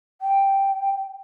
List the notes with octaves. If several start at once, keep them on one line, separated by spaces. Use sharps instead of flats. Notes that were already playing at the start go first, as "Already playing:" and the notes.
G5